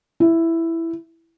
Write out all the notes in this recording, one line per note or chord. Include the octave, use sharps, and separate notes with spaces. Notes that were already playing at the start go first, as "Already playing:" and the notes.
E4